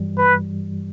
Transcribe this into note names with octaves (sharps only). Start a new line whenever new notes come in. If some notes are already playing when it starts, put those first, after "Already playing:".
Already playing: G2 E3 G3
B4